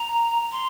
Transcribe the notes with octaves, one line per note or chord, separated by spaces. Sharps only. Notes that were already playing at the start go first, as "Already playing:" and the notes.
Already playing: A#5
C6